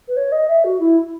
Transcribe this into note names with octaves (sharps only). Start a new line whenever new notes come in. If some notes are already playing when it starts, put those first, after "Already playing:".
B4
C#5
D#5
E5
F#4
E4